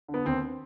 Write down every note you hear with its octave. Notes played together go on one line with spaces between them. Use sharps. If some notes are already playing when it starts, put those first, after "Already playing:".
D3
B3
D#2 C4